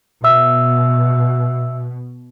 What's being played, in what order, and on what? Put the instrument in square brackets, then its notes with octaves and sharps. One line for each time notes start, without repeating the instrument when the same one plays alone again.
[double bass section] B2 [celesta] E5 E6